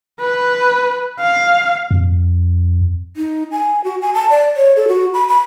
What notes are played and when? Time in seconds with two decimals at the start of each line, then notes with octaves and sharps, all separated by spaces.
0.20 B4
1.20 F5
1.91 F2
3.17 D#4
3.52 G#5
3.84 F#4
4.02 G#5
4.14 A5
4.30 D5
4.57 C#5
4.76 A4
4.88 F#4
5.14 B5
5.29 B5